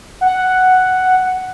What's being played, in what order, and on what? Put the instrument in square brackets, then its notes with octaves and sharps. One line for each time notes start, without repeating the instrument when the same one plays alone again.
[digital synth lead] F#5